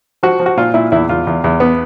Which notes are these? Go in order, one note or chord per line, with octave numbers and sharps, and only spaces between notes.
F3 F#4
F3
F#4
A#2 F4
A#2 E4
E2 E4
E2 F4
E2
E2
B3